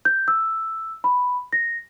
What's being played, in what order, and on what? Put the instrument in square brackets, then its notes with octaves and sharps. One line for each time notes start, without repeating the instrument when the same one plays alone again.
[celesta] G6
E6
B5
A#6